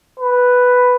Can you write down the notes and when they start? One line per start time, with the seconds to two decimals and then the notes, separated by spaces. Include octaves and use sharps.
0.19 B4